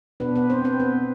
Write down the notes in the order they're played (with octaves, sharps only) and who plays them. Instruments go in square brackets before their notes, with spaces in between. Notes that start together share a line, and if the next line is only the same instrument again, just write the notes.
[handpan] B2 B3 D4 B4
B3 B4
C4 C5
C4 C5
B3 B4